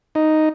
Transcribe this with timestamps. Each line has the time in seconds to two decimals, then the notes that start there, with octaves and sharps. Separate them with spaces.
0.15 D#4